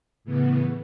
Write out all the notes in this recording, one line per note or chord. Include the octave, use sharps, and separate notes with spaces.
A2 C#3 E3 B3